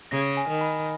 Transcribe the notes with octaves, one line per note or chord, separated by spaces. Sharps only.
C#3 A#6
G#5
D#3
B5